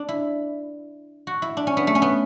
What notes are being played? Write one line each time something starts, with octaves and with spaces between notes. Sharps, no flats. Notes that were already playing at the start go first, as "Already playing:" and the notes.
Already playing: D4
E4
F#4
E4
D4
C#4
B3
A3
C#4
B3